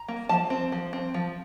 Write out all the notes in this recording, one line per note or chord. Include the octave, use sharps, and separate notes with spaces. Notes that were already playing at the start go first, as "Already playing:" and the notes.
Already playing: A#5
A#3
F3 A5
C4
F3
C4
F3